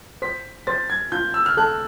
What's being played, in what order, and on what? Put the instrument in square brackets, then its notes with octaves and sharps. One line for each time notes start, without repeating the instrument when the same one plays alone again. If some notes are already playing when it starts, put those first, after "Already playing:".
[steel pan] C5 [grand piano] B6
[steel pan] C5 [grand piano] A6
[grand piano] G#6
[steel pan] F4 [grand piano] G6
[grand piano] E6
F6
[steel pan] A4 [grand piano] F#6